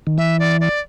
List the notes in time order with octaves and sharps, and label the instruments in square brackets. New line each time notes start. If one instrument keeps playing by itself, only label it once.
[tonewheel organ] D#3
[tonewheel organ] E3 [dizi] E5
[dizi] D5
D5